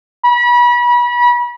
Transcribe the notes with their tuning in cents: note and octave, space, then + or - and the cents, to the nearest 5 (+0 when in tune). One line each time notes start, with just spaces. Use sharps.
B5 -35